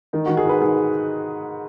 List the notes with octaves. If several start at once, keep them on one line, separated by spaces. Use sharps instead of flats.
D#3 D#4
D#3 F#4
G#4
G#2 B4
D#3 G#4